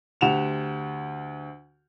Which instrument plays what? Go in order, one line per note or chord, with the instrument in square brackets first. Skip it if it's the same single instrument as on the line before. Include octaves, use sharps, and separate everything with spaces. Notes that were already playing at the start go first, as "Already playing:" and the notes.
[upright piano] D2 G4 F#5 E7 F7